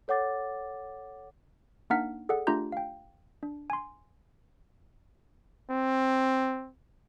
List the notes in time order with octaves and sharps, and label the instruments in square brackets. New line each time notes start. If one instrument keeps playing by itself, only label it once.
[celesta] A4 C#5 F#5 D6 A6
[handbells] A#3 D4 D#4 F#5 F6 B6
G#4 A4 D5 F#5
A3 D4 F4 G4 A#5 G6
F5 G5
D4
G#5 C6
[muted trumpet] C4